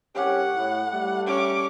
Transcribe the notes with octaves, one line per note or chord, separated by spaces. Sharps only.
C2 C#4 G4 F#5
A2
G3 A3
C#4 D6